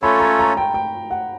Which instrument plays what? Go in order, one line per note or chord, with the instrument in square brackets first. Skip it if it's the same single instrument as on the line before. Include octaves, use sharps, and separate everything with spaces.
[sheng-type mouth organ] A3 C#4 F4 A4 C#5 [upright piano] B5
[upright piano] A#5
A#5
G5
G5
F#5